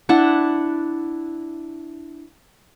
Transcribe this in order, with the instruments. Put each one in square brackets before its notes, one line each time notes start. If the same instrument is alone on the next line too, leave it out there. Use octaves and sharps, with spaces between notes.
[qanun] D4 E4 F#5 A5